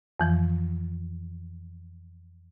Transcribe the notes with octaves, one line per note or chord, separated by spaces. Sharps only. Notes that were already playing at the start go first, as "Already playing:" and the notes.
F2 E3 F3